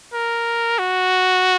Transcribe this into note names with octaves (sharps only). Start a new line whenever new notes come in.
A#4
F#4